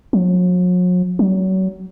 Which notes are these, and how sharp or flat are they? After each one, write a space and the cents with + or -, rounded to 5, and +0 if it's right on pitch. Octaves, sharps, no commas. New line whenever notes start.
F#3 -45
F#3 +30